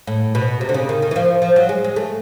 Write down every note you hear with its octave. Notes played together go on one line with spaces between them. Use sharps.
A2
B2
C3
D3
C#3
D#3
D#3
E3
F3
F3
F#3
G#3
G#3
A3